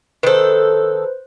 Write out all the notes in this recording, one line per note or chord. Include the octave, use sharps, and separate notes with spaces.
D#3 A4 B4 C5